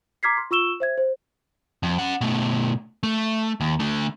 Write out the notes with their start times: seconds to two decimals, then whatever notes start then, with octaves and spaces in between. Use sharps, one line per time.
0.23 A#5 D6 F6 G#6 B6 C7
0.37 C6
0.51 F4 C#6 E6 E7 G7
0.80 C5 E5 G#6
0.98 C5
1.83 F2
1.99 C#4 F#5
2.21 B2 A3
3.03 A3
3.61 D#2
3.80 D3 A3